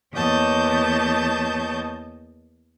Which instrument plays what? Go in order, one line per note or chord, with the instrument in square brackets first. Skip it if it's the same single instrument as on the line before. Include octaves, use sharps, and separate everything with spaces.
[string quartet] E2 A#3 C#5 D#5 A5 G6